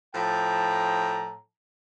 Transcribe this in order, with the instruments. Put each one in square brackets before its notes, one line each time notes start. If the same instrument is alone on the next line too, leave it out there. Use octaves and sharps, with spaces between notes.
[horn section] A2 F3 G5 A5 A#5